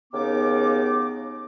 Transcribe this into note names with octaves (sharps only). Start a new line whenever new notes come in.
D#2 C#3 B3 D#4 D6